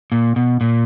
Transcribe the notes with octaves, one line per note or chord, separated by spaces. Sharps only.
A#2
B2
A#2